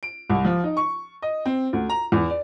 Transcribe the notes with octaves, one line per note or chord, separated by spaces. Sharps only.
D7
C2
F3
D#4
C#6
D#5
C4
D2
A#5
E2
D5